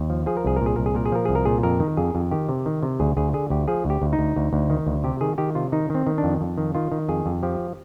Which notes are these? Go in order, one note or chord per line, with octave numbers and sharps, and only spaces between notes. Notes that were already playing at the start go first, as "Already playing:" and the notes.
Already playing: D#2
F3
F3 G#4
A#4
C2 G#4
A#2 A#4
G#4
C2 A#4
G#4
A#2 A#4
G#4
F3 A#4
C2 G#4
A#4
A#2 G#4
F2 A#4
D#3
F2 G#4
F2
D#3 G4
C3
D#3
C3
D2 G#4
D2 G#4
D3 G#4
D2 G4
F3 G#4
D2 G4
D2
D#4
D2
D2
D2
D#3
D2
C3 G4
D#3 G#4
D#3 G4
C3 F4
D#3 D#4
D#3 C4
D#3
D4
F2
F2
D#3
D#3 F4
D#3
F2 G#4
F2
F3 G4